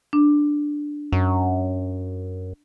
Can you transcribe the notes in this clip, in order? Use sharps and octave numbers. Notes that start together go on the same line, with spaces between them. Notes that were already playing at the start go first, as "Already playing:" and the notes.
D4
F#2